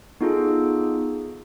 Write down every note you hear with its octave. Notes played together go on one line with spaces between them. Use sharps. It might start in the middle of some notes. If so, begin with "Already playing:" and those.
B3 D#4 F4 G#4 A4